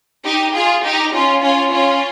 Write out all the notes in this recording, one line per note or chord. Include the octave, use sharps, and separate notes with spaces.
D#4 G4
F4 G#4
D#4 G4
C#4 F4
C#4 F4
C#4 F4